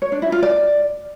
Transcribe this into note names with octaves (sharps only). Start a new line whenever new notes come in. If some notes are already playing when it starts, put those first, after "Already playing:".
C#5
D4
E4
F4
D5